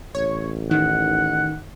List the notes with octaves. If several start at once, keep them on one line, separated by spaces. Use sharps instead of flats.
A1 C#5
D#3 F#5